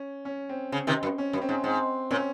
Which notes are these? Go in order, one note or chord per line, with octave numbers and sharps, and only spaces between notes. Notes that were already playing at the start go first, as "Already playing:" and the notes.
Already playing: C#4
C#4
C4
C#3
C3 D#3
F#2
C#4
F#2
C4
G#2
G#2 C4
A#2 C#4